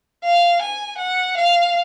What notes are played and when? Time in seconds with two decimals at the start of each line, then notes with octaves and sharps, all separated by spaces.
0.24 F5
0.62 G#5
0.98 F#5
1.37 F5